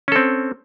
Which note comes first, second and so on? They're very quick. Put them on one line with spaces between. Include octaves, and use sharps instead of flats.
C#4 A4 C4